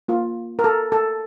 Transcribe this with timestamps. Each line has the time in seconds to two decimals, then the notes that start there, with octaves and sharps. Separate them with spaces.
0.08 A#3 F4
0.59 A#4
0.64 A4
0.92 A4